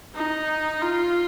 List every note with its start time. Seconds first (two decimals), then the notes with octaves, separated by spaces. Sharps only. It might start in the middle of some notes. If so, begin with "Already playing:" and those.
0.15 D#4
0.81 F4